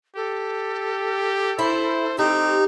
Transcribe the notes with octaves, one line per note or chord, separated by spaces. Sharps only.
G4 A4
E4 C5
C4 D#4 G4